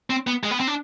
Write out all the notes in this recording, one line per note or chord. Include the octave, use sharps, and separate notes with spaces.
C4
B3
G#3
B3
C4
D4